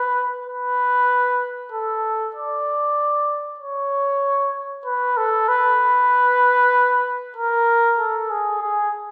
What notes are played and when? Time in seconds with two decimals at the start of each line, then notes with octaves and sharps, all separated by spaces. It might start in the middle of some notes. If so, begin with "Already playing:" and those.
Already playing: B4
0.46 B4
1.72 A4
2.35 D5
3.60 C#5
4.85 B4
5.17 A4
5.48 B4
7.36 A#4
7.99 A4
8.30 G#4
8.62 G#4